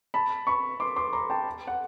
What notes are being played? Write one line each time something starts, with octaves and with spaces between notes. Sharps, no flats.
A5 B5
B5 C#6
C6 D6
C6 D6
A#5 C6
G5 A5
F#5